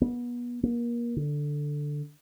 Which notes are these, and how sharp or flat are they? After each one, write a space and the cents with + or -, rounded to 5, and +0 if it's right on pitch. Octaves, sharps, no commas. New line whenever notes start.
B3 -30
A#3 +30
D3 +0